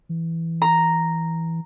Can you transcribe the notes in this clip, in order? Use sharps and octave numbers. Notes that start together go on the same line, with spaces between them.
E3
A#5